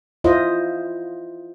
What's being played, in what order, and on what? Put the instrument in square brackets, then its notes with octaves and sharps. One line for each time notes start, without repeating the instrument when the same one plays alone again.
[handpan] E4 F4 C5 D#5